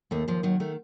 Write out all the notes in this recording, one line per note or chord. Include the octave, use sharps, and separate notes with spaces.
D#2 A3
D#2 F3
D#3 F#3
D#3 A3